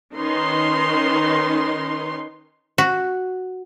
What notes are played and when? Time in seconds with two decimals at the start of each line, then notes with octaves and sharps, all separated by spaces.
0.14 D#3 C#4 D#4 B4 C6
2.78 F#4